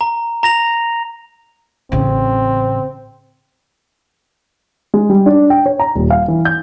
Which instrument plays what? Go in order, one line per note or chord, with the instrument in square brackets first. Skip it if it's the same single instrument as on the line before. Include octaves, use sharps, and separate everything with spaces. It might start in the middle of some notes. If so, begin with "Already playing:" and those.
[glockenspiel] A#5
A#5 A#6 F7
[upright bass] A1 C#3 [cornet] C4
[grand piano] G#3
G3
D4
G5
C#5
A#5
D#1
F5
E3
G6